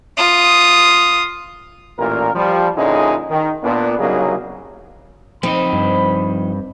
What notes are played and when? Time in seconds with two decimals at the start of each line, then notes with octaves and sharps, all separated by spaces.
0.17 F4 D#6
1.99 A1 A#2 A#4
2.35 F3 G3
2.76 A#2 D3 C#4 D#4 E4 G#4
3.30 D#3
3.63 A#2 B3 D4
3.98 C2 C#3 F#3 A#3 D#4 G#4
5.43 F3 C4 D#4 D#5 B5
5.73 G2